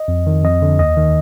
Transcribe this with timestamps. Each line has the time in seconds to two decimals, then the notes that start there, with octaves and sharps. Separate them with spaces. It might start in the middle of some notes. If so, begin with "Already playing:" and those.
Already playing: D#5
0.08 F2
0.27 D#3
0.44 F2 D#5
0.62 D3
0.79 D#2 D#5
0.97 D#3